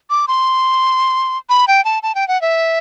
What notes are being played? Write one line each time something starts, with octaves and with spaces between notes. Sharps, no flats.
D6
C6
B5
G5
A5
A5
G5
F#5
E5